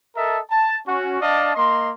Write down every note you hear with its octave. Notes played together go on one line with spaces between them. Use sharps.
A4 A#4 D#5 E5 A5
A5
C#4 F#4
D4 D5 D#5 F5 A5
A#3 D#5 C6